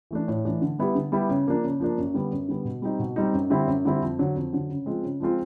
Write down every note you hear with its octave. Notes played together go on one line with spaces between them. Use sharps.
E3 A3 D4
A2
E3 A3 D4
D3
G3 B3 E4 G4
D3
G3 B3 E4 G4
C#3
F3 A#3 D4
C#3
F3 A#3 D4
F#2
D3 G3 B3
F#2
D3 G3 B3
B2
G3 C4 D#4
B2
G3 C4 D#4
F#2
D3 G3 C4 E4
F#2
D3 G3 C4 E4
F2
D3 F#3
F2
D3 F#3
C#3
F3 G#3 C4 F4
C#3
F3 G#3 C4 F4